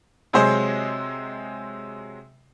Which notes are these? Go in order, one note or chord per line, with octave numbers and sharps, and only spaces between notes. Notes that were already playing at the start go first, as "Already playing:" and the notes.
C3 F#3 G#3 G#4 C5